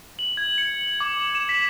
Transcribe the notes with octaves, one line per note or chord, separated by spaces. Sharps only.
F#7
G#6
C#7
D6
E7
B6